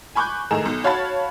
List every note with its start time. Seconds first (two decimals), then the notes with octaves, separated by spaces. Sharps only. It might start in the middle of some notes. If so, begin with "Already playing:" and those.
0.15 G#5 B5 C#6 D6 F#6 G6
0.51 A2 D#3 G#4 A#5 E7
0.65 B1
0.84 F#4 C#5 F5 A5 B5 A6